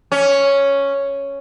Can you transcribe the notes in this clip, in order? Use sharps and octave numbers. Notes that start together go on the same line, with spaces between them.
C#4